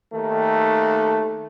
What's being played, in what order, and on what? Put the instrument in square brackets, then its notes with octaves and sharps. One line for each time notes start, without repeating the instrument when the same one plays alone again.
[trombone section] D#2 D#3 A3